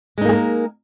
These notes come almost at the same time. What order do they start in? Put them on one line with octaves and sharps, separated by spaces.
G#3 D#4 A#3 G#4 A#4